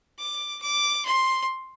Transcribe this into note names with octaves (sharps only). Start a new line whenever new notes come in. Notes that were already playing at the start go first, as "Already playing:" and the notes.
D6
D6
C6